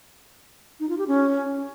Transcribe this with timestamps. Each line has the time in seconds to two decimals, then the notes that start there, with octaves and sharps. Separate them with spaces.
0.80 D#4
0.89 F4
0.98 G4
1.07 C#4